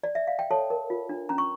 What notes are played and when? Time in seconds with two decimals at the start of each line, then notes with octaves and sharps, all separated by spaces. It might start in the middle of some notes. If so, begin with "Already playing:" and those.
0.03 D5
0.15 E5
0.27 F5
0.39 G5
0.51 A4 C#5 A5
0.70 A#4
0.90 F4
1.09 D4
1.29 C#4 A#5
1.38 C#6